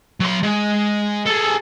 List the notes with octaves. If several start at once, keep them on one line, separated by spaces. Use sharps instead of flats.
F#3 C6
G#3
G#4 A4